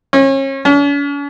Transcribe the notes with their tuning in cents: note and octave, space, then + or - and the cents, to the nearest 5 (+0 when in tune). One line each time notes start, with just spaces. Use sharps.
C#4 -35
C#4 +45